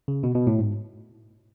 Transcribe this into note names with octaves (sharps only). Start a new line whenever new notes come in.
C#3
B2
B2
A2
G#2